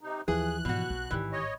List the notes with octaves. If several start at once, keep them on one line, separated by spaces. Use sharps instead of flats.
C3 D#4
D#2 E3 F3 G#4 F#6
G#2 B2 F#4
B1 F3
A1 G#2 D#3 E3 G4
C#5 D#5